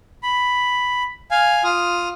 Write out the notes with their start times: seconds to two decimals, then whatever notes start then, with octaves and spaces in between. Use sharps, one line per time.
0.23 B5
1.31 F5 G#5
1.64 F4 D#6 F6